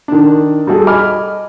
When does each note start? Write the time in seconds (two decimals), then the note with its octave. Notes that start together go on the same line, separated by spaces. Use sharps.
0.08 D#3 D4
0.67 G3 F#4 G#4 A4
0.87 D#5 G#5 B5 D6 F6